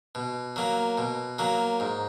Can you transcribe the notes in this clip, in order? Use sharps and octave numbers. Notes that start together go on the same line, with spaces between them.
B2
F#3 A#3
B2
F#3 A#3
G#2